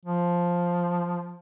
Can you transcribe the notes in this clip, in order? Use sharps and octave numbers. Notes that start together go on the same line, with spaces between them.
F3